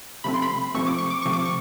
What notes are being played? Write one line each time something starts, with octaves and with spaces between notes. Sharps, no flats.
C3 F3 A3 C4 B5
C6
B5
C3 F3 A3 C4 C#6
D6
C#6
D6
C3 F3 A3 C4 C#6
D6
C#6